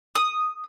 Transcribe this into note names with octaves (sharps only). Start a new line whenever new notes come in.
D#6